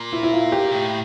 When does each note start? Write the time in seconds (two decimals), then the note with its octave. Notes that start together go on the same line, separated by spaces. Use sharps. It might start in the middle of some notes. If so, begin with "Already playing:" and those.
Already playing: A#2
0.13 E4
0.23 E4
0.33 F4
0.52 G4
0.71 A2